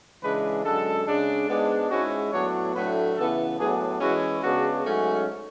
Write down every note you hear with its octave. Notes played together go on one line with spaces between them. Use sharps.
C#3 E3 G#3 D4 B4
F#2 D3 G#3 A4
C#3 G#3 D4
G#2 G#3 B3 D4
G#2 G#3 C#4 E4 F#4
A2 F#3 B3 D4 C#5
A2 F#3 A3 D4 B4
C#3 E3 B3 E4 A4
A2 F#3 B3 D4 G#4
E3 G#3 C#4 E4 F#4
C#3 G#3 B3 D4 F#4
G#2 F#3 A3 C#4